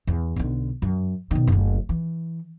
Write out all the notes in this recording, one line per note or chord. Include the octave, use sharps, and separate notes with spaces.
E2
B1 D3
F#2
B2 D#3
F#1 D2
E3